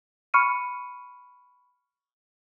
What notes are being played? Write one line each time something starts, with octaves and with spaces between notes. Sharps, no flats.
B5 C#6 F6 C#7 D#7